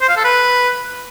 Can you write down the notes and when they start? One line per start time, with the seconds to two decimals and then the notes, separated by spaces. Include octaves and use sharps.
0.01 C5
0.09 F5
0.17 A4
0.24 B4